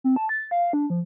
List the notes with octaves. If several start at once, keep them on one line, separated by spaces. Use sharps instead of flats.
C4
A5
A6
F5
D4
F3